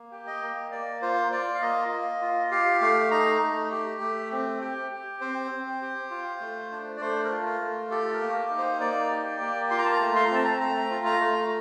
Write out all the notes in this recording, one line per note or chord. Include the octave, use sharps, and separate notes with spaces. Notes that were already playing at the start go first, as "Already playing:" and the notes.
Already playing: A#3
G4
D#5
A#3
A#3 D5
F4 C5
F4 D5
F5
A#3 D#5
A#3
F4
G4 F5
A3 F5
D#4 A#5
A3
G4
A3
C4
G4
G4
C4 C5
C4
G4
F4
A3
D4
D5
A3 C5
A#4
F4
A#4
A3
G4 A4
A#4
A#3
D#4
C5
A#3 D5
G4
A#3
F4 C6
A#5
A5
A#5
A3
C6
A#5
C4 A5
A#5
A3 A#5
F4
A#5
A3